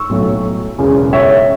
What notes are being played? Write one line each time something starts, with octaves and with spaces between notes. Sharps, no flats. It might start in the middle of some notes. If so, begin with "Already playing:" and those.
Already playing: C#6 E6
B1 A2 F#3
E1 E2 C#3
C#5 E5